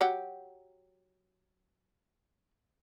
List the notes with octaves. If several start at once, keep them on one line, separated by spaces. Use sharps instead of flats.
F#3 G4 F#5